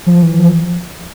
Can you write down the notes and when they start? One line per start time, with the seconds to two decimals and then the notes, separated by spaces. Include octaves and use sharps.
0.07 F3
0.23 E3
0.39 F3